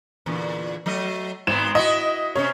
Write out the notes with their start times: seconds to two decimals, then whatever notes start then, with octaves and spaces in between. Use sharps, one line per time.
0.26 E2 A#2 D3
0.86 F#3 A3 D#5
1.47 G#1 B3 C4 E7
1.75 E4 F#4 D#5
2.35 C3 C4 C#4 C#5